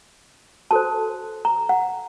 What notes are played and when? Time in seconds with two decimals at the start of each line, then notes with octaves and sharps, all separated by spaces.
0.71 F#4 A4 C5 A5
1.45 A#5
1.69 F#5